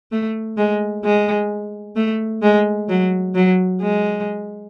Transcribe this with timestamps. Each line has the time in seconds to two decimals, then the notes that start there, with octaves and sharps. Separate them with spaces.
0.11 A3
0.57 G#3
1.04 G#3
1.96 A3
2.42 G#3
2.89 F#3
3.35 F#3
3.82 G#3